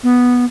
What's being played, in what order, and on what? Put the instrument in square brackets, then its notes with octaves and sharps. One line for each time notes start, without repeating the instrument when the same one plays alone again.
[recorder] B3